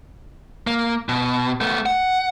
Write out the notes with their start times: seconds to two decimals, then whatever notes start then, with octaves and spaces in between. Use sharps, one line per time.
0.67 A#3
1.09 B2
1.61 A3 B3
1.86 F#5